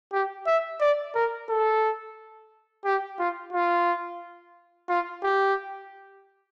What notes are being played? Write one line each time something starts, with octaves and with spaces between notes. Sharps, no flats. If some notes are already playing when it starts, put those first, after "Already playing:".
G4
E5
D5
A#4
A4
G4
F4
F4
F4
G4